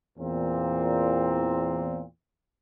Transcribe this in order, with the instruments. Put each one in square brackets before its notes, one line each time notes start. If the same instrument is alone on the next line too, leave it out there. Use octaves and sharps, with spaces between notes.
[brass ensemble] E2 A#2 C4